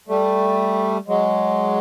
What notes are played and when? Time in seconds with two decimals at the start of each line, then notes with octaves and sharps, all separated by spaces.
0.08 G3 A3
1.08 F#3 G#3